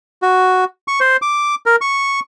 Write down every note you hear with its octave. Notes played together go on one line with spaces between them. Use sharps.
F#4
C#6
C5
D6
A#4
C#6